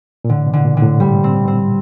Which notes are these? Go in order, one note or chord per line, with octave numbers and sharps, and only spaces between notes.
A#2
A2 D3
B2
D3
A#2
D3
A2
G#2 G3
C4
C4